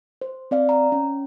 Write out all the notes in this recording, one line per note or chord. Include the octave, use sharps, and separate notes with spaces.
C5
C4 D5 F5
A#5
C#4